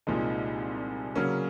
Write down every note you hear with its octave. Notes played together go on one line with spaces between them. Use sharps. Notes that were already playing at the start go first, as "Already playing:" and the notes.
C2 A#2 F3 G#3 D#4
C#3 F#3 A#3 C#4